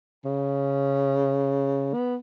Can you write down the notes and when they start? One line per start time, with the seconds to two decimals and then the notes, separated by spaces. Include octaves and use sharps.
0.24 C#3
1.93 B3